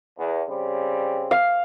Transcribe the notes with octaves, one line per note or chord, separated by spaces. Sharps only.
E2
C#3 G3 C4
F5